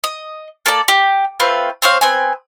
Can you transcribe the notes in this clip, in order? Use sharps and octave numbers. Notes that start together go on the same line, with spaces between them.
D#5
A#3 A4 D5 A5
G4
A3 C4 F4 B4
C4 C5 C#5 F5
B3 C4 G#5